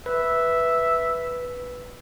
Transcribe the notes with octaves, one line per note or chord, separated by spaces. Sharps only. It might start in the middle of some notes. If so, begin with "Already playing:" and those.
B4 E5